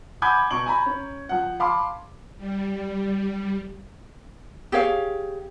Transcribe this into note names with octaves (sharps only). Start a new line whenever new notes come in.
F#5 G#5 B5 D6 G6 G#6
B2 C#6 D7 F#7
G#5 A#5 B5
C#4
F3 F#5
F5 A5 B5 C6 D6
G3
G4 G#4 C#5 F5